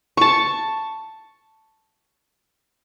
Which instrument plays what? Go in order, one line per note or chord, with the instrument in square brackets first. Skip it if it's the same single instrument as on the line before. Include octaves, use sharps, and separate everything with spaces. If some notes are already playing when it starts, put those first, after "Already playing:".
[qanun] A5 C#6